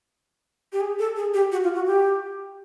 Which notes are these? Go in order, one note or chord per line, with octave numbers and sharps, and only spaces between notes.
G4
G#4
A4
G#4
G4
F#4
F4
F#4
G4